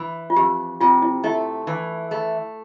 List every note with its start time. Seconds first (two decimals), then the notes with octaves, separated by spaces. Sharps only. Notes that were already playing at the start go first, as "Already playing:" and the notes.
Already playing: E3
0.30 F4
0.36 F2 G4
0.80 C3 F4
1.02 E4
1.24 A3 E4
1.67 E3
2.11 A3